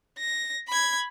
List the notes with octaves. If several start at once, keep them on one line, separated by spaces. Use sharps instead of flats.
A#6
B5 G#6